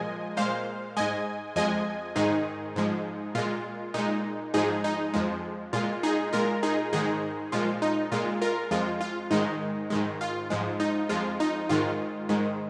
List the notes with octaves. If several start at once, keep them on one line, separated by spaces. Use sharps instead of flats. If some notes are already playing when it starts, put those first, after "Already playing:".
Already playing: A#2 F3 G#3 D#5 G#5
A#2 G#3 C5 F5
G#2 G#3 D#5 G#5
F2 F3 G#3 D#5 G#5
G#2 D#3 G#3 D#4 G#4
G#2 F3 G#3
A#2 G#3 F4
A#2 G#3 D#4
G#2 F3 G#3 D#4 G#4
D#4
F2 F3 G#3
A#2 G#3 F4
D#4 G#4
A#2 G#3 F4 A#4
D#4 G#4
G#2 D#3 G#3 D#4 G#4
A#2 F3 G#3 F4
D#4
A#2 G#3 F4
F4 A#4
F2 F3 G#3 F4
F4
G#2 D#3 G#3 D#4
G#2 D#3 G#3
F4
G#2 F3 G#3
D#4
F2 F3 G#3 F4
D#4
G#2 D#3 G#3 F4
G#2 D#3 G#3